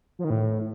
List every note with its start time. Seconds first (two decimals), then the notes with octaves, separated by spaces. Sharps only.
0.19 F3
0.24 D#3
0.30 A2